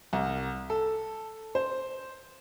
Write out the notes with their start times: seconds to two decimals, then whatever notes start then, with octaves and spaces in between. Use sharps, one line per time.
0.13 C2
0.70 A4
1.55 C5